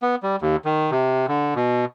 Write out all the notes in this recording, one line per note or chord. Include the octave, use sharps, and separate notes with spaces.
B3
G3
D#2
D#3
C3
D3
B2